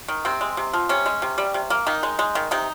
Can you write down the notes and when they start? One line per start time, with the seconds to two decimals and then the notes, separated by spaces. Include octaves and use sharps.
0.08 D#3
0.25 C3 C4
0.41 G#3
0.57 C3
0.73 F3
0.89 C3 C#4
1.06 G#3
1.22 C3
1.38 G3
1.54 C3
1.70 A#3
1.87 D#3 D#4
2.03 G#3
2.19 G#3
2.35 D#3
2.51 C3 D#4